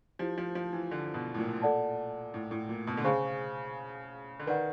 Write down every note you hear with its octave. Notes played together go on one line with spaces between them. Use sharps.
F3 E4 G4 C5
F3
F3
E3
D3
B2
A2
A#2
A4 D5 F#5 A5
A2
A2
A#2
B2
D3
C#3 G#4 C5 F5 G#5 C#6
D3
D#3 B4 D5 F#5